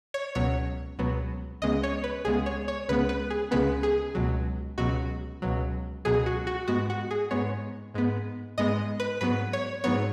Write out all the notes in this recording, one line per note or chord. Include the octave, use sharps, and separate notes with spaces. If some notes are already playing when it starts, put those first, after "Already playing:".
C#5
C#2 B2 F#3 B3 C#5
C#2 B2 F#3 B3
C#2 C#3 G#3 B3 D#5
C#5
B4
C#2 C#3 G#3 B3 G#4
C#5
C#5
C#2 C#3 G#3 B3 B4
B4
G#4
C#2 C#3 G#3 B3 B4
G#4
C#2 B2 F#3
C#2 B2 F#3 F#4
C#2 B2 F#3
C#2 B2 F#3 G#4
F#4
F#4
G#2 G#3 B3 F#4
F#4
G#4
G#2 G#3 B3 C#5
G#2 G#3 B3
G#2 G#3 B3 D#5
B4
G#2 F#3 B3 B4
C#5
G#2 F#3 B3 C#5